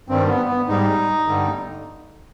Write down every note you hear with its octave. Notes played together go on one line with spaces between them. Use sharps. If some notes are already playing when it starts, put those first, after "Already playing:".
G2 D#3 G3 C4
B3
B3
G#2 G3 D#4
G2 D3 G3